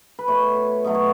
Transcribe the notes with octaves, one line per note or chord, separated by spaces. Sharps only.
B4
B2 A3 C#5
B2 F#3 A3 D#5
C#5